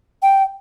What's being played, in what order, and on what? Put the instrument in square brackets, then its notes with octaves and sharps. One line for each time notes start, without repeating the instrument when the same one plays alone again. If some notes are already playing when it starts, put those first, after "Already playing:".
[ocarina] G5